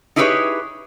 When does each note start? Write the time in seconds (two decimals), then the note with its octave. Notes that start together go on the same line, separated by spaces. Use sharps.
0.16 D#4 E4 G4 G#4 B4 C#5